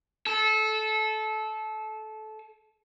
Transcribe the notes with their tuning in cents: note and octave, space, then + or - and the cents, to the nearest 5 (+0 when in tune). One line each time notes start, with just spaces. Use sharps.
A4 -20